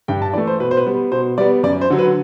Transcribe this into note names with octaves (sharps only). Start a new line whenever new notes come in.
G2 G5
A5
E3 A3 D5
C5
B2 B4
C5
B4
G3 B3
B2 C5
G3 B3 D5
F#2 D5
C5
D3 F#3
B4